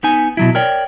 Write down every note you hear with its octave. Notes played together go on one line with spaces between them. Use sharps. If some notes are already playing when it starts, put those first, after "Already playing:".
B3 D#4 G#5
B2 F#3 E4
A#4 C#5 D5 G5